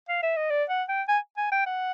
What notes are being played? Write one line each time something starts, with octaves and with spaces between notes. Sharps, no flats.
F5
E5
D#5
D5
F#5
G5
G#5
G#5
G5
F#5